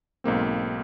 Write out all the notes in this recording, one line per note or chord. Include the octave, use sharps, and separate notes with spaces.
B1 G#2 A#3 C4